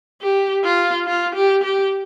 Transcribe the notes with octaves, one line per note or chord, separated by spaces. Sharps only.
G4
F4
F4
G4
G4